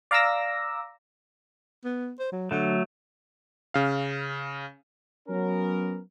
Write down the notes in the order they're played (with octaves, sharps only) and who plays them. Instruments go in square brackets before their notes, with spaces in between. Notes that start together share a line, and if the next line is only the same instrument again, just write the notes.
[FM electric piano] D5 F5 A#5 D6 E6 A#6
[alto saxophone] B3
C5
F#3
[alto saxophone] D3 [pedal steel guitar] F#3 A3
[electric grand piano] C#3 F5
[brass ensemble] F#3 B3 C#4 A#4